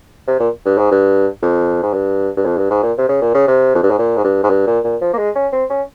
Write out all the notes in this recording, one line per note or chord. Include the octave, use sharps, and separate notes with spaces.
C3
A#2
G2
G#2
G2
F2
G#2
G2
G2
F2
G2
G#2
A#2
C3
C#3
A#2
C#3
C3
F2
G2
G#2
A#2
G#2
G2
G#2
G2
A#2
A#2
F3
A#3
G#3
C#4
C4
C#4